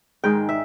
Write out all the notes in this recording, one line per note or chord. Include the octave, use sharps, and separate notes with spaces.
G#2 D#3 G#3 D#4 G5
E5